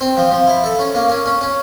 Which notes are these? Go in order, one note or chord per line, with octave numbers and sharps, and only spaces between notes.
C4
F3
F3
E4
A4
C#4
A#3
C#4
C#4
C#4